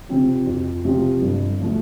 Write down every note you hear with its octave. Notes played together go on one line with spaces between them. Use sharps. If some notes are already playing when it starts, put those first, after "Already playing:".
C3 F3 C4 F4
F2
C3 F3 C4 F4
G1
F3 A3